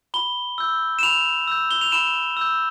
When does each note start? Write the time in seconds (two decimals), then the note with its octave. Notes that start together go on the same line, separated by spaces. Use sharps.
0.14 B5 G7
0.58 E6 G6
0.99 E7
1.03 B5 F7
1.47 E6 G6
1.71 G7
1.81 F7
1.92 B5 E7
2.37 E6 G6